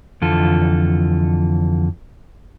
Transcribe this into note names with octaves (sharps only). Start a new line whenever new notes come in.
F2 D3 E3 F4 A4